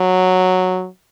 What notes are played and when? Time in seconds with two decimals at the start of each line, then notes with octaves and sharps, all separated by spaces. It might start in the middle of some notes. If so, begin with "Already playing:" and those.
Already playing: F#3